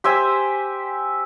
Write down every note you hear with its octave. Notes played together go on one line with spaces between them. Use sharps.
G4 C5 E5 G#5